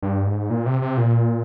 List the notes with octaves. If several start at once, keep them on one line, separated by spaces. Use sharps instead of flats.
G2
G#2
A#2
C3
C3
A#2